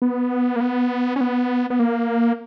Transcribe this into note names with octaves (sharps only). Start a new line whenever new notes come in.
B3
A#3
B3
C#4
B3
B3
A#3